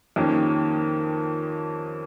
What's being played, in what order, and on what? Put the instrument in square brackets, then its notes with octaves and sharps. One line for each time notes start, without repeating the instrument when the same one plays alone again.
[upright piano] F2 D#3 A#3 C#4 G4